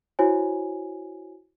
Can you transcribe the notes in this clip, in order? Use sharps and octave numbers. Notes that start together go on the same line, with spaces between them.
E4 F#4 C5 C#5 G#5